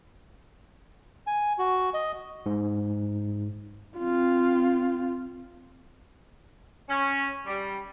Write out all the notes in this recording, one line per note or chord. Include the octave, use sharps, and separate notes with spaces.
G#5
F#4
D#5
G#2
C4 F4
C#4
G3